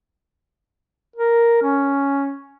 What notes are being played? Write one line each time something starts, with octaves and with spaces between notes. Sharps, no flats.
A#4
C#4